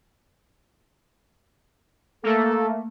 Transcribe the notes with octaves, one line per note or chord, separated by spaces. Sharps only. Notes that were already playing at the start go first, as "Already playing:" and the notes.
A3 A#3 A4